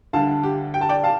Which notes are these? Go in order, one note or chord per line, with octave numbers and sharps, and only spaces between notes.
D2 D3 G3 F5 A5
G4
G5
A5
D5 G5
F5 A5